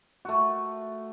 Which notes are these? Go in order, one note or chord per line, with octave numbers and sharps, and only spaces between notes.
A3 F#4